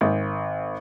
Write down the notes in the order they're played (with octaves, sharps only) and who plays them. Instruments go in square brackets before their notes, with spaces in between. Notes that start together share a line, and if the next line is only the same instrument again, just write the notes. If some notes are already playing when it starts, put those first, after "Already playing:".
[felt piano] G#1